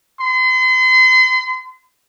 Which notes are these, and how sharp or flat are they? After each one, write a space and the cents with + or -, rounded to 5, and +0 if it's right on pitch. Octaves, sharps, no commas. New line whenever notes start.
C6 -40